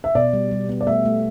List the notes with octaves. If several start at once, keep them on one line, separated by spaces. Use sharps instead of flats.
E5
B2 D5
G3
G3
B3
D5
A3 E5
A3